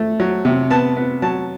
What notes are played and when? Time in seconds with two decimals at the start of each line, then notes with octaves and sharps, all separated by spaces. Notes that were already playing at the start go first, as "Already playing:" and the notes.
Already playing: A3
0.20 F#3
0.45 C3
0.70 B3 A5
0.97 B3
1.22 F#3 A5